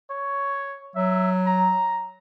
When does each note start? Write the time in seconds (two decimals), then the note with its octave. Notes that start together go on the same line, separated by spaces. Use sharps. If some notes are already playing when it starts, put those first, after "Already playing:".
0.11 C#5
0.96 F#3 E5
1.47 A#5